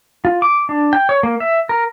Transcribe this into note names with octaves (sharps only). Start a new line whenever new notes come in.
F4
D6
D4
G5
C#5
A#3
E5
A#4